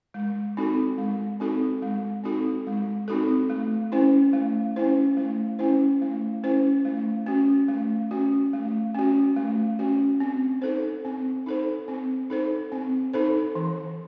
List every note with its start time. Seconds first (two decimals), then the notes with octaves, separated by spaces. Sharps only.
0.14 G#3
0.57 C4 D#4 F#4 A4
0.98 G#3
1.40 C4 D#4 F#4 A4
1.82 G#3
2.24 C4 D#4 F#4 A4
2.67 G#3
3.08 C4 D#4 F#4 A4
3.50 A3
3.92 C#4 E4 C5
4.33 A3
4.76 C#4 E4 C5
5.17 A3
5.59 C#4 E4 C5
6.02 A3
6.44 C#4 E4 C5
6.85 A3
7.26 C#4 F#4
7.68 A3
8.11 C#4 F#4
8.53 A3
8.95 C#4 F#4
9.36 A3
9.79 C#4 F#4
10.20 C4
10.62 D#4 A4 C5
11.05 C4
11.46 D#4 A4 C5
11.88 C4
12.30 D#4 A4 C5
12.72 C4
13.14 D#4 A4 C5
13.55 E3